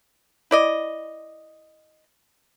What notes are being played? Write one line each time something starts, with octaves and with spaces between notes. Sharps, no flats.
E4 D5 D#5